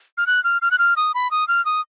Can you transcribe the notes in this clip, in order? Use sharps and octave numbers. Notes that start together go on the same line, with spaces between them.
F6
F#6
F6
F6
F#6
F6
D#6
B5
D#6
F6
D#6